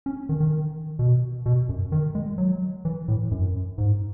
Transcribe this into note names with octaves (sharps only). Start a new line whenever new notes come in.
C#4
D#3
D#3
B2
B2
F#2
D#3
G#3
F#3
E3
A2
F#2
G#2